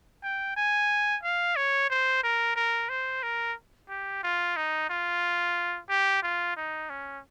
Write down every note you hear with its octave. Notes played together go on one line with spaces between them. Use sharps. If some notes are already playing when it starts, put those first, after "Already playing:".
G5
G#5
F5
C#5
C5
A#4
A#4
C5
A#4
G4
F4
D#4
F4
G4
F4
D#4
C#4